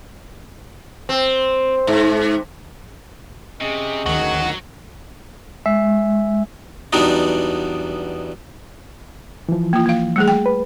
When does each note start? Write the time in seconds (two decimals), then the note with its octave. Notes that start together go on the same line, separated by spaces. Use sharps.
1.09 C4
1.87 G#2
3.61 C3 C#4 G#4 D#5
4.06 D2 D#3 F#3 F#4
5.66 G#3 E5
6.93 E2 F#3 G3 B3 D4 D#4
9.49 E3 F3
9.73 A#3 F4
9.86 A#3 F5
10.16 G3 A3 G#4
10.28 G5
10.46 B4